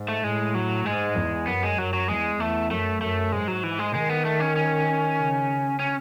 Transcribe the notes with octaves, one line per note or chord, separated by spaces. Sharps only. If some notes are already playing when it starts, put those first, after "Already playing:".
Already playing: G#2
A3
A2 G#3
F#3
G#2 G#3
E2
F#2 B3
G#3
F#2 F#3
F#3
E2 G#3
E2 A3
F#2 A3
F#2 A3
G#2 G#3
F#3
E3
G#3
D#3 G#3
B3
A3
C#4
C#4
C#3
C#4